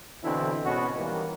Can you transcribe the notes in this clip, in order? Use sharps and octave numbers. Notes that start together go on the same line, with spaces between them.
B2 D3 E3 C4 D4 E4
G#1 B2 B3 C#4 F#4
D#3 E3 G3 A#3